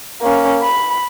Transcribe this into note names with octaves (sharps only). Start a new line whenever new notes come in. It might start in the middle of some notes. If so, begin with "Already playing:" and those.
A#3 C#4
B5